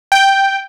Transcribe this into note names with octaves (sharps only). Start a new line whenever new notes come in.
G5